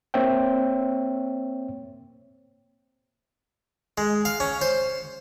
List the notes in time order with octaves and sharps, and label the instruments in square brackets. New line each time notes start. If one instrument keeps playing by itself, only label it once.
[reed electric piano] A#3 C4 C5 C#5 E5 G5
[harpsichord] G#3
F5
C#4
C5